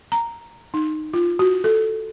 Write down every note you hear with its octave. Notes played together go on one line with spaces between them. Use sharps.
A#5
D#4
F4
F#4
A4